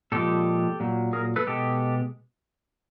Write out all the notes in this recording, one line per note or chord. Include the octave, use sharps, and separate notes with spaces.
A#2 F3 G#3 G4 A4
A#2 F#3
G#4 A#4
A4 B4
B2 G#3 G4 A4